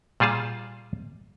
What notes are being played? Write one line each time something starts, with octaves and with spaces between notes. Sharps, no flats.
A#2 G3 F4 G#4 A5